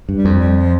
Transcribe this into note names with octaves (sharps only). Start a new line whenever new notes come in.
G2
G3
F2
G3
F3